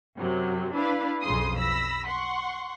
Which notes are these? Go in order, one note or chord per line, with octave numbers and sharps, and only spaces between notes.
F#2 C3 F#3
D4 E4 B4 F5
B1 F2 C#3 C6 D#6 C7
B5 E6 A#6 B6
F#5 C6 C#6